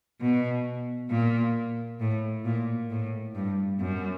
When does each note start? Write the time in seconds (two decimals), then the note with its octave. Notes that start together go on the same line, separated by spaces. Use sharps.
0.21 B2
1.10 A#2
2.00 A2
2.45 A#2
2.90 A2
3.35 G2
3.80 F#2